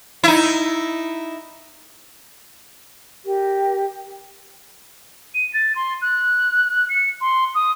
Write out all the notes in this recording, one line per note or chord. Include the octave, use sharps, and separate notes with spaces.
D#4 E4
G4 A#4
D#7
A6
C6
F#6
C#7
C6
D#6